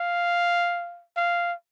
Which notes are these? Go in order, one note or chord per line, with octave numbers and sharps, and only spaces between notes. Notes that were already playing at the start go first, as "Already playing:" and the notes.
Already playing: F5
F5